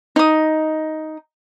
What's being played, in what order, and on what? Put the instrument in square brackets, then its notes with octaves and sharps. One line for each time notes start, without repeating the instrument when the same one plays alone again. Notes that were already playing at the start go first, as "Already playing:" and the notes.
[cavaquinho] D#4 D#6